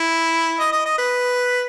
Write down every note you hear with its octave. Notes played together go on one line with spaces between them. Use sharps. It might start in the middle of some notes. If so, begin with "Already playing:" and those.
Already playing: E4
D#5
D#5
D#5
B4